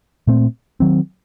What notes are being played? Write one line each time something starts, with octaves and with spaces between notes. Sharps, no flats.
A#2 A3 C4
D#3 F#3 C4